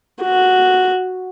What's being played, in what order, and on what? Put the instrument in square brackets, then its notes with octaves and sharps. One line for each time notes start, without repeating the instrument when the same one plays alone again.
[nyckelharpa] F#4